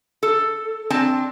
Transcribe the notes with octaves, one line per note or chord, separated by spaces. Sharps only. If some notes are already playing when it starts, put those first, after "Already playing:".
A4
C4 D4 A5